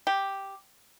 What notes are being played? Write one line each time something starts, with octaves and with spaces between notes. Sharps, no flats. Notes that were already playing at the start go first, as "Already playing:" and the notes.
G4